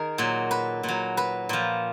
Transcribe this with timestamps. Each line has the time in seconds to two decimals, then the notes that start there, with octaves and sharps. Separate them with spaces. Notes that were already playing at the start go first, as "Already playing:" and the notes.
Already playing: D#3 G#4 A#4
0.18 A#2 F#3
0.51 B4
0.83 A#2
0.88 F#3
1.17 B4
1.49 A#2 F3